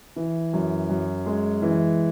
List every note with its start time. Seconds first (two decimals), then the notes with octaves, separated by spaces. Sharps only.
0.16 E3
0.53 F#2
0.90 F#2
1.26 G#3
1.62 E3